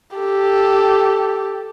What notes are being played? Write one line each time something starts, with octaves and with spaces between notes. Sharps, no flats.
G4 A4